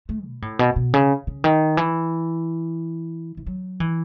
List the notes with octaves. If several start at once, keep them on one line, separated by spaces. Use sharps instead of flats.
A3
B2
A2
B2
B2
C#3
C#3
D#3
E3
E3
F#3
E3